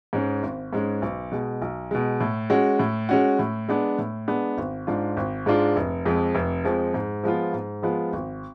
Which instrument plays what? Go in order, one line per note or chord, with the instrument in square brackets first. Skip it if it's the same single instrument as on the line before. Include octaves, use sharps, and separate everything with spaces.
[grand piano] G#2 G#3 C#4
G#1
G#2 G#3 C#4
B1
B2 G#3
B1
B2 G#3
A2
G#3 C#4 F#4
A2
G#3 C#4 F#4
A2
G#3 B3 D4
A2
G#3 B3 D4
G#1
G#2 G#3 D4 F4
G#1
G#2 G#3 D4 F4
F1
F2 F3 G#3
F1
F2 F3 G#3
G#2
F3 G#3 B3 F4
G#2
F3 G#3 B3 F4
G#1